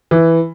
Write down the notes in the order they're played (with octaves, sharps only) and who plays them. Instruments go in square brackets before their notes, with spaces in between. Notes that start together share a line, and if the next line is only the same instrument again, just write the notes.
[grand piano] E3